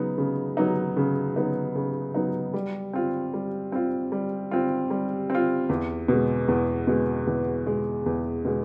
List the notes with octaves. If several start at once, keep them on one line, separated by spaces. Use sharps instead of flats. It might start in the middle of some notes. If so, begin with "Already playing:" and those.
Already playing: C#3 F#3 B3 D#4
C#3
F#3 B3 D#4
C#3
F#3 B3 D#4
C#3
F#3 B3 D#4
G3
C4 F4
G3
C4 F4
G3
C4 F4
G3
C4
F4
E2
B2 G#3
E2
B2 G#3
E2
B2 G#3
E2
B2 G#3